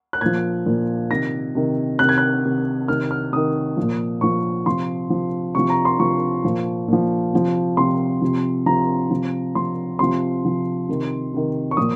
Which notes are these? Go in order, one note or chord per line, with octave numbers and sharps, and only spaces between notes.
F#6
A#2 F3 G#6
A#2 F3
C3 D#3 A#6
C3 D#3
C3 D#3 F#6
G#6
F#6
C3 D#3
C3 D#3 F6
F6
C3 D#3 D#6
A#2 F3
A#2 F3 C#6
C3 F3 C6
C3 F3
C3 F3 C#6
A#5
C6
C3 F3 C#6
A#2 F3
A#2 F3
C3 F3
C3 F3 C6
C3 F3
C3 F3 A#5
C3 F3
C3 F3 C6
C3 F3 C6
C3 F3
C3 D#3
C3 D#3
C#6
A#2 F3 D#6